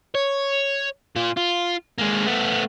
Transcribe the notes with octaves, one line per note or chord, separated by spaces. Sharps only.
C#5
A#2 F4
F4
G#3 A#3
A3 B3